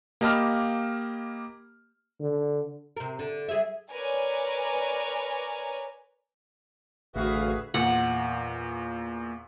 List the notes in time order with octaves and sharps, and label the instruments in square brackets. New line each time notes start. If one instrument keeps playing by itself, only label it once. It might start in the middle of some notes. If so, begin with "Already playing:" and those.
[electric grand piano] A#3 G4 D#5 A5 B5 F6
[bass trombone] D3
[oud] C3 A#4
D3
G3 G#4 E5
[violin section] A#4 B4 C#5 D5 G#5
[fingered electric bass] A1 [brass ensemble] D2 F5 [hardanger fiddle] F#4 [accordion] G#4 B4 E5
[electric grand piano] E2 A#2 [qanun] F#5